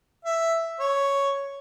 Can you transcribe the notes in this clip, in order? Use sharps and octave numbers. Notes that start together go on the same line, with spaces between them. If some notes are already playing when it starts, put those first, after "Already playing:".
E5
C#5